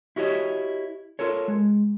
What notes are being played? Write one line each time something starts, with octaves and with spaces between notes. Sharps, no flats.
E4 F#4 G4 C#5 D#5
F4 A4 A#4 C#5
G#3